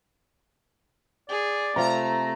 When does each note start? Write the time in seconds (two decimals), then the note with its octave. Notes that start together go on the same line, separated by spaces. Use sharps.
1.29 G#4 D5
1.76 C3 A3 C4 F4 A#5